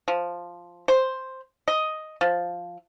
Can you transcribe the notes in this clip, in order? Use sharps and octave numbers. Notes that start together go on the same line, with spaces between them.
F3
C5
D#5
F3